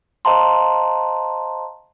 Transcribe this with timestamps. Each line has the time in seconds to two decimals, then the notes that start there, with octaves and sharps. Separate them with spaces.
0.25 C5 D#5 F5 A5 A#5 C6